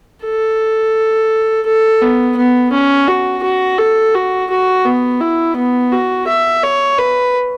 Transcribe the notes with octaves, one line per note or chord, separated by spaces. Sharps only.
A4
A4
B3
B3
C#4
F#4
F#4
A4
F#4
F#4
B3
E4
B3
F#4
E5
C#5
B4